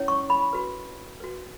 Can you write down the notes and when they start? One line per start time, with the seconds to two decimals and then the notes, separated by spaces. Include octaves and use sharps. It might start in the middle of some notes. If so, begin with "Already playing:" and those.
Already playing: C#4 E4 C#5
0.08 C#6
0.30 B5
0.53 F#4 B4
1.20 F#4 B4